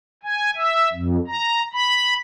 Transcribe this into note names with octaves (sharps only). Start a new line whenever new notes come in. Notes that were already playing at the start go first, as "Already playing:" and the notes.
G#5
E5
F2
A#5
B5